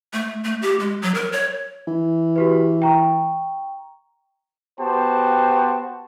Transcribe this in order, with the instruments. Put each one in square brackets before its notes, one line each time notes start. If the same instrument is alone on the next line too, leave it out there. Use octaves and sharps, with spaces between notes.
[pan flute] A3
A3
G4
G#3
F#3
A#4
C#5
[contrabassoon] E3
[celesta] F#4 G4 B4
G5 A#5 C#6
[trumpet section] B3 F#4 G4 C5 G5 A5